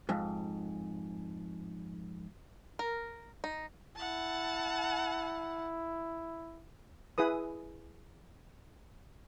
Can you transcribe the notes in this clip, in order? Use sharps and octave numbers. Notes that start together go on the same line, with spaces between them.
F2 G#2
A#4
D#4
E4 F#5 A5
E4 G#4 B4 D#6